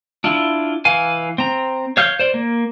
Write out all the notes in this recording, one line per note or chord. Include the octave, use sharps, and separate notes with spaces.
D4 E4 F4
E3 F5 G#5
C4 A#5
C#5 F5 F6 G6
C5 D5
A#3